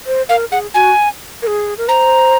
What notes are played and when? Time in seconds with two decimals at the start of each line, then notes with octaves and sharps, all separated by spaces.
0.06 C5
0.29 A#4 F5
0.51 G#4 F#5
0.74 F#4 G#5
1.42 A#4
1.47 G#4
1.78 A#4
1.88 C5 A#5